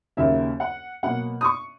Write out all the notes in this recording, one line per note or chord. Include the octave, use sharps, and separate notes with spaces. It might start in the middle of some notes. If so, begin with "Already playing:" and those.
D#2 C#3 F#3 A#3 E5
F#5
B2 F#3 A#3 F#5
D#6
C#6